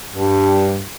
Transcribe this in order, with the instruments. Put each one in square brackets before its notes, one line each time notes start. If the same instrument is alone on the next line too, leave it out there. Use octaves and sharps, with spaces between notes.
[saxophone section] G2